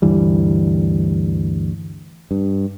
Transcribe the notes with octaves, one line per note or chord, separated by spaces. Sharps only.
D2 G2 E3 G3
G2